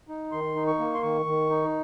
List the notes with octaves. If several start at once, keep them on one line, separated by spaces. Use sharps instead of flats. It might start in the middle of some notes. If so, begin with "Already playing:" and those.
D#4
D#3 C6
D#4
C#6
A#3
C6
D#3 C#6
D#3
D#4